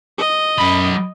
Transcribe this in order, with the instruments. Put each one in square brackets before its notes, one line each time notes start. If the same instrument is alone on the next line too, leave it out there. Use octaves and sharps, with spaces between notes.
[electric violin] D#5
[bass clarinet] F#2 [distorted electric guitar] F#3 B5